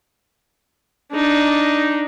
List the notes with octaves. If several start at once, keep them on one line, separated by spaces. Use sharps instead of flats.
D4 D#4